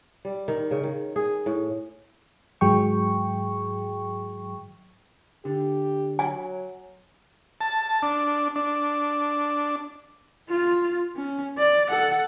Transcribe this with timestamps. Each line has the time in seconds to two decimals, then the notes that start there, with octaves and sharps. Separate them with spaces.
0.25 G3
0.48 D#3
0.71 C#3
0.83 D#3
1.16 G#4
1.46 A2
2.61 G#2 D#3 F#3 G#4 G5 C#6
5.45 D3 G4
6.19 F#3 G#5
7.61 A5
8.02 D4
8.56 D4
10.49 F4
11.16 C#4
11.58 D5
11.90 A4 F#5